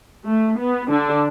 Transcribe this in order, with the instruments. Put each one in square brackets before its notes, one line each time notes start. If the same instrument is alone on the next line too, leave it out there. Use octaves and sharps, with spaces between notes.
[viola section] A3
B3
D3 D4